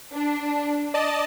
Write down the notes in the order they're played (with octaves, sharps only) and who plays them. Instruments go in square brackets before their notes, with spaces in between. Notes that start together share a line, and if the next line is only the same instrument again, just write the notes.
[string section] D4
[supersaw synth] D5 D#5 A5